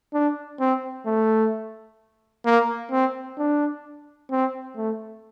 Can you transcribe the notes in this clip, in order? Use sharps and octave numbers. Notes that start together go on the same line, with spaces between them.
D4
C4
A3
A#3
C4
D4
C4
A3